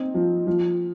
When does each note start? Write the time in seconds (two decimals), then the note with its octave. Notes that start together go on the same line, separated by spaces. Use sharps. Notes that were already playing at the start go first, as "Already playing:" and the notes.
Already playing: C4 D#4
0.14 F3
0.47 F3